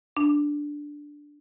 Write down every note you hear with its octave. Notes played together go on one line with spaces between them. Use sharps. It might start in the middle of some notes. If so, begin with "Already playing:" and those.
D4